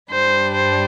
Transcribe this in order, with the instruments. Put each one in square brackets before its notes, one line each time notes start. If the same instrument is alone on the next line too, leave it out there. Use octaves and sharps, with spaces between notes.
[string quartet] G2 G3 D4 [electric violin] C5
[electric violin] C5